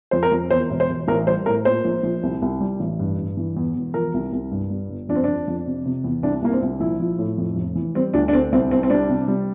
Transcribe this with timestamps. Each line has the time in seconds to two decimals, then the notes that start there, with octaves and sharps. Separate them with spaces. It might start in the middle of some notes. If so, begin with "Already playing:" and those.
0.11 F2 C5
0.23 A#4
0.32 F2
0.51 E2 C5
0.70 E1
0.80 C5
0.89 E1
1.08 A1 A#4
1.27 G3 C5
1.46 A2 A#4
1.65 A#2 C5
1.85 A#1
2.03 A#1
2.23 C2
2.42 C2
2.60 G3
2.80 A1
2.99 G2
3.18 G2
3.37 E3
3.57 E2
3.75 E1
3.94 F3 A#4
4.14 C2
4.33 C2
4.51 G2
4.70 G3
4.89 G1
5.09 F2 D4
5.15 C4
5.24 F2 D4
5.48 F2
5.66 C3
5.86 C3
6.04 E2
6.23 C2 D4
6.42 C2 A#3
6.52 C4
6.62 C2
6.80 A#1 E4
7.00 F3
7.19 A2
7.38 F2
7.56 F1
7.76 E3
7.95 G3 C4
8.14 D2 D4
8.28 D4
8.33 D3 C4
8.52 C2 C4
8.71 C2 C4
8.83 C4
8.90 G3 D4
9.09 C3
9.28 G3